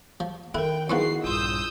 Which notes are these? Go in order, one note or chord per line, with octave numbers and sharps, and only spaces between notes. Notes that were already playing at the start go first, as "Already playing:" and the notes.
F3
D#3 E4 A4 A#4 G5
F3 B3 C4 D#4 E4 F#4 G#4 C7
A#1 G2 F4 C6 D#6 E6 G6